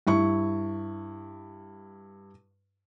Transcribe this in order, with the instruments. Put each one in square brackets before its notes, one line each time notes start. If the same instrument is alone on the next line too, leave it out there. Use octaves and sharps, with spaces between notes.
[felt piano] G2 E4 C#6